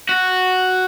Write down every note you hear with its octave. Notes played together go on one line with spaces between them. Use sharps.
F#4